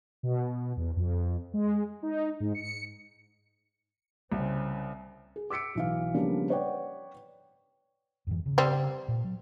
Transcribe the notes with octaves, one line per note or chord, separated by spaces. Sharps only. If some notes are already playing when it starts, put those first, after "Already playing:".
B2
E2
F2
G#3
D#4
G#2
C#7
C2 C#3 C4
G#4
D6 E6 B6 C#7 D7
B1 E3 F5
C#3 F3 G3 A#3 B3 D4
B4 C#5 D5 F#5 G5
F2 G#2 E3
C#3
G3 C4
A#2
F#3